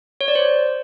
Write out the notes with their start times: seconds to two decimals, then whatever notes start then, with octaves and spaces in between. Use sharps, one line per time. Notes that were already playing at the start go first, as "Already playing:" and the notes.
0.21 C#5
0.28 D5
0.35 C5